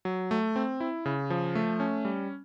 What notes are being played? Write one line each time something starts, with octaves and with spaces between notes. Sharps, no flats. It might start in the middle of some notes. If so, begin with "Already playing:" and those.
F#3
A3
C4
E4
C#3
F3
A3
C#4
G3